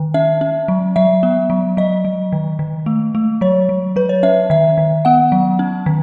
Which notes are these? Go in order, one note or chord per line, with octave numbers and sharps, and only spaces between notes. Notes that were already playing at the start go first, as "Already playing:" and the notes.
Already playing: D#3
C#4 E5
C#4
F#3
F#3 E5
B3
F#3
F#3 D#5
F#3
D#3
D#3
A3
A3
F#3 C#5
F#3
F#3 B4
C#5
C#4 E5
D#3 E5
D#3
B3 F#5
F#3
C#4
D#3